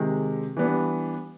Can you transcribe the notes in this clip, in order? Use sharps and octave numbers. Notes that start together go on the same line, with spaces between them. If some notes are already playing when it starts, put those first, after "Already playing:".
Already playing: C3 D#3 G#3
E3 G3 B3 D4